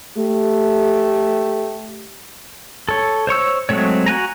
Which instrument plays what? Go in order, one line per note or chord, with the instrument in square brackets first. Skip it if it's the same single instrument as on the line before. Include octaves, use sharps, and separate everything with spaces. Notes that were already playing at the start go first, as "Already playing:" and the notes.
[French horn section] A3 G4
[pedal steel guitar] A4 C#5
C5 C#5 C#6 E6
F#3 G#3 A3 C4 C#5
F#4 F#5 G#5 A#5